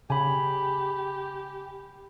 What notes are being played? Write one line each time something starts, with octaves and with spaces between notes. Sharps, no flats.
C#3 G4 G#5 B5